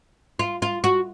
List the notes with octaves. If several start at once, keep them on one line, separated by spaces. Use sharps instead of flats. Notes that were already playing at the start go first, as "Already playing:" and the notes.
F4
F4
F#4